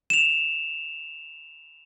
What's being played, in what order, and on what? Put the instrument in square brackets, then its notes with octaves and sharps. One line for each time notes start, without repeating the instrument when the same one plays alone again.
[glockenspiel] E7 F7